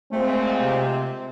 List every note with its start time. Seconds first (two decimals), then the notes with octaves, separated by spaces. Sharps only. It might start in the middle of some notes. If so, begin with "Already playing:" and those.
0.12 A#2 G#3 A3 C4
0.60 C3